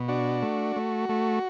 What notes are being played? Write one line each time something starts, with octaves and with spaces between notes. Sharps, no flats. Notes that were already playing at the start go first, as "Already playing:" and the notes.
Already playing: B2
D4 F#4
A3
A3
A3